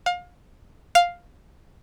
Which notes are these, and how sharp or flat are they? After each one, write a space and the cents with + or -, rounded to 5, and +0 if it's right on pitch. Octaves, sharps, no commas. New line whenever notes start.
F5 +30
F5 +5